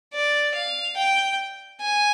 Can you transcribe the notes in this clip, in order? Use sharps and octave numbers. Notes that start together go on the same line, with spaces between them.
D5
F5
G5
G#5